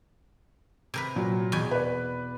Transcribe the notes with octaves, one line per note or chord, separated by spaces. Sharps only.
C3 A#4 B4
A#2 F#3
E2 B2 G#5
B4 D5